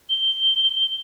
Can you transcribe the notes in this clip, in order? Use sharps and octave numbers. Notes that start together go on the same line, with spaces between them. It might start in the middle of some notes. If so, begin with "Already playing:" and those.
G7